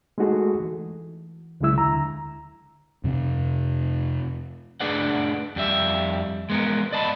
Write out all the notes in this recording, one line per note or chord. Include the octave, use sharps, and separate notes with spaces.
G#3 A3 D#4 F#4 G#4 A4
E3
C#2 C#3 F#3 G#3 E4 E6
D#2 D3 A#5
F2 C3 B3 C4
A3 D4 G#4 B4 D5 F#5
F2 G3 E5
G#3 B3 A#4
D5 D#5 A5 B5